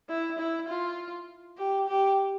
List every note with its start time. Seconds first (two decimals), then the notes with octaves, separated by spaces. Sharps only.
0.09 E4
0.39 E4
0.68 F4
1.58 G4
1.87 G4